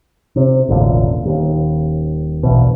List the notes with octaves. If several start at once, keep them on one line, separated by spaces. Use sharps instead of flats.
C3
E1 A1 A#2 D3
D#1 D#2
A#1 E2 B2